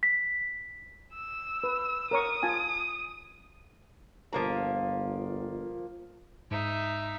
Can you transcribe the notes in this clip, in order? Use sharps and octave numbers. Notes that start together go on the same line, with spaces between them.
B6
E6
B4
A#4 C#5 C#6 D#6
F4 G#5 A5
G1 F3 A#3 A#5
G#2 D#4 E5